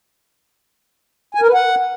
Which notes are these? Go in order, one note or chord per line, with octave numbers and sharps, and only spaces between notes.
G#5
A#4
B4
F#5